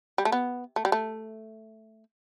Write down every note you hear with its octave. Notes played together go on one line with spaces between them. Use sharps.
G3
A3
B3
A3
G3
A3